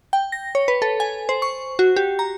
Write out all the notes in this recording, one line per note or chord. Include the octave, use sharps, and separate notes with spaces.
G5
A#6
C#5
B4
A4
G#5
C5
C#6
F#4
G4
A#5